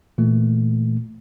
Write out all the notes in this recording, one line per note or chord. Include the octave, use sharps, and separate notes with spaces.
A#2 E3 A3